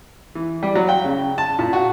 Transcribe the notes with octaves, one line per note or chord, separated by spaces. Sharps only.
E3
G3
F#3
G5
C#3
A5
A#2
F#4